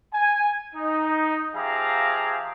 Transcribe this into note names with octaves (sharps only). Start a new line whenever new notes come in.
G#5
D#4
F3 G4 G#4 E5 F5 A#5